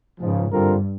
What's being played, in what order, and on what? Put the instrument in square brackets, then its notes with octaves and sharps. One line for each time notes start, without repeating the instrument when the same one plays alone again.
[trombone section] C#2 C#3 F3 [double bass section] G#2
[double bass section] G2 [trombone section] D3 G3 C4 F4 A#4